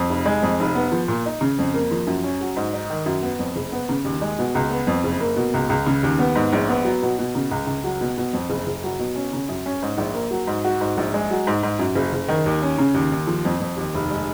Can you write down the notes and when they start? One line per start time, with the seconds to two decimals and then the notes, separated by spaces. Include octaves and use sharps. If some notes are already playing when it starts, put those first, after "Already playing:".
Already playing: F2
0.10 F1
0.26 G#3
0.43 F2
0.60 F1
0.75 B3
0.92 F3
1.08 A#2
1.26 D#4
1.41 C#3
1.58 F2
1.74 A#3
1.91 F3
2.07 F#2
2.24 C#4
2.41 F#3
2.56 G#2
2.74 D#4
2.90 D#3
3.06 F#2
3.23 B3
3.39 F2
3.56 F#1
3.72 B3
3.89 C#3
4.05 D#2
4.21 G#3
4.39 B2
4.55 C#2
4.70 B3
4.87 F2
5.04 F#1
5.20 A#3
5.36 B2
5.54 C#2
5.69 C#2
5.86 C#3
6.03 D#2
6.19 B3
6.35 G#2
6.53 A#1
6.69 B3
6.85 F#3
7.02 B2
7.19 B2
7.35 C#3
7.51 C#2
7.67 C#2
7.84 F#3
8.01 B2
8.18 B2
8.33 F2
8.50 F#1
8.67 F#1
8.83 F#3
8.99 B2
9.16 C#4
9.33 C#3
9.49 F#2
9.66 C#4
9.82 G#2
9.98 A#1
10.14 A#3
10.31 F#3
10.47 G#2
10.65 F#4
10.81 G#2
10.97 A#1
11.14 G#3
11.31 F#3
11.47 G#2
11.63 G#2
11.79 F#2
11.95 F#1
12.13 F#1
12.28 D#3
12.46 D#2
12.62 C#4
12.79 C#3
12.94 D#2
13.12 D#2
13.27 F3
13.45 F2
13.60 F2
13.77 D#2
13.94 F1
14.11 G#3